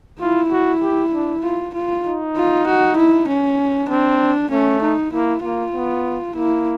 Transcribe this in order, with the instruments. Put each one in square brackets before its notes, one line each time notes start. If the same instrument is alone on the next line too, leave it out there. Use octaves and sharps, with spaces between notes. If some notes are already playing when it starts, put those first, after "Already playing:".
[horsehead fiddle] E4 [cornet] F4
[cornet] F#4
G4
D4
[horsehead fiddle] F4
F4
[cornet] D#4
[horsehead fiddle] F4
F#4
E4
C#4
[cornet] C4 [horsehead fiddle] D4
[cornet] A3 [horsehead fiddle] C#4
[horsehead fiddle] D#4
[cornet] A#3 [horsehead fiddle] E4
[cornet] A#3 [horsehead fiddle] F4
[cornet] B3
[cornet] A#3 [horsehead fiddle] E4